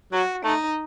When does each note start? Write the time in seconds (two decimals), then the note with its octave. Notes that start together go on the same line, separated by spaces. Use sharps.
0.12 F#3 F#4
0.44 A3 D#4